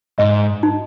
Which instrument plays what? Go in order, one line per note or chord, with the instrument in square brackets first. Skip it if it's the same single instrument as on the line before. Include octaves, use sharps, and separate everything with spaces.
[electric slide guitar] G#2 [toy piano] D#5
[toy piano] D#4